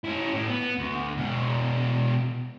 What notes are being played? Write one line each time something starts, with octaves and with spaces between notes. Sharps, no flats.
C#4 E4
A2
B3
D2
B2 G#3